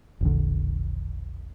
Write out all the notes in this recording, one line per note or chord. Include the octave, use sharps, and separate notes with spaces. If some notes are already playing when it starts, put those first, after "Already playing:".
E1 A#1 D3